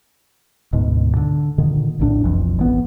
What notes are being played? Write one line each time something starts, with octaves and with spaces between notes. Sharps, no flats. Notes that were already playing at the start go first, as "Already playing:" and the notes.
D2 G#2 B2
D3
A#2 D3 D#3
A#1 D#2 A2 D4
F1 B1 F2 E3
G#1 E3 B3